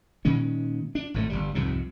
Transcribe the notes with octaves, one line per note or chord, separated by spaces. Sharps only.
A#2 D#3 G#3 C#4
D4
G#1 A2 D#3 A3
G1 G3
C2 F2 G#2 C3